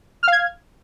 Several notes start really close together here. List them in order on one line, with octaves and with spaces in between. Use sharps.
F6 F5 G#6